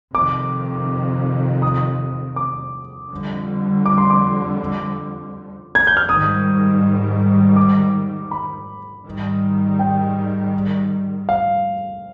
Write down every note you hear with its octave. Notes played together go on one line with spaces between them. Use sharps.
F2 C3 D#3 D6
D#6
D6
F2 D3 G3
D6
C6
D6
G#6
G6
F6
G#2 D#3 G3 D#6
D6
B5
G#2 D#3 G3
G5
F5